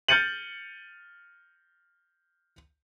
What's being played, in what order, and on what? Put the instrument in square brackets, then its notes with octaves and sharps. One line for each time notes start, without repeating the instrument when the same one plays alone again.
[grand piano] F6 G6 A6 C#7 D#7 F#7